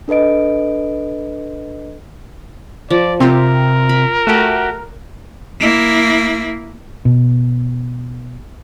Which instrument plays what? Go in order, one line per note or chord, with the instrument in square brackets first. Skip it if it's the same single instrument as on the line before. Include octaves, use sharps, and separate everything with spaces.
[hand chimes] D4 A4 B4 D#5 D7
[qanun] F3 [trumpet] D5
[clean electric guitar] C3 [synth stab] C4 [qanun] F4 G4 [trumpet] A#4
[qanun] B5
[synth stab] A3 [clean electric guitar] F#4 G4
[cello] A#3 E4
[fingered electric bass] B2